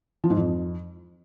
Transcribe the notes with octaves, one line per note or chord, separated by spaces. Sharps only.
F3
G#2
F2